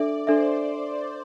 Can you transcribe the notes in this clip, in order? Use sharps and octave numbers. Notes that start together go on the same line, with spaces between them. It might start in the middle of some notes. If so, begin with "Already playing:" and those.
Already playing: D4 A4 D5 E5
D4 A4 C5 E5